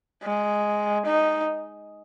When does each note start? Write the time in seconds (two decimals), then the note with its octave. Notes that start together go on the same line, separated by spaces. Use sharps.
0.23 G#3
1.06 D#4